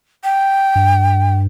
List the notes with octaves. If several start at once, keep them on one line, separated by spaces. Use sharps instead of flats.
G5
G2